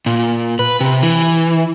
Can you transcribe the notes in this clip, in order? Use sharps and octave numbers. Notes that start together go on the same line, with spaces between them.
A#2
B4
C3
E3